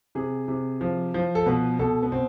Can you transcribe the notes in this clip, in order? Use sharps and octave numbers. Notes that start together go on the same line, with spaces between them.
C3 G#4
C3
F3
F3
A4
B2 B4
B2 A4
B3
B2 C4